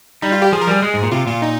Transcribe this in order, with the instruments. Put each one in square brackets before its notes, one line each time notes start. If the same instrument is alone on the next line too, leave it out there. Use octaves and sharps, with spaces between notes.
[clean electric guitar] G3 [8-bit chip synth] D#4
[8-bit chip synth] F4
G4
[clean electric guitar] F3 [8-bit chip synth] G#4
[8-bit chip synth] A#4
[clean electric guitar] G3 [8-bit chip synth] G#4
[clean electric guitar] G#3
G#2
A#2
[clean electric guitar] C3 [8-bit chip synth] F4
[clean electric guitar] A#2 [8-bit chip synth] F4
[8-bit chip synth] D#4